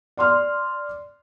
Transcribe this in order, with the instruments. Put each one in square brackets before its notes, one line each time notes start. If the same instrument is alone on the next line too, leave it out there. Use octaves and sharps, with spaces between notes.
[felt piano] D5 C6 F6